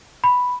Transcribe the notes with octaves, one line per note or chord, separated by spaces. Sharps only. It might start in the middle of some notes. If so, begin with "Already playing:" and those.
B5